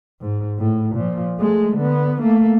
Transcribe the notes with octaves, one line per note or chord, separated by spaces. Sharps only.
G#2
A2
A#2 F3
G#3 A3
D3 B3
A3 A#3